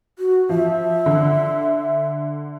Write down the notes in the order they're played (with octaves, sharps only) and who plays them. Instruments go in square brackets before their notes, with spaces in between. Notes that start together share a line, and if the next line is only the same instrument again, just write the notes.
[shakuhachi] F#4
[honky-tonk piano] F3 [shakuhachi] E5
[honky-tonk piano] D3